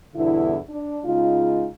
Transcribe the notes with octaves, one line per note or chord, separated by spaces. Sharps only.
E2 G2 B2 D3 E4
D4
C#3 G#3 D#4 F4